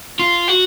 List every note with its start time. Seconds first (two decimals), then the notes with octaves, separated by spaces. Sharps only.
0.19 F4
0.48 F#4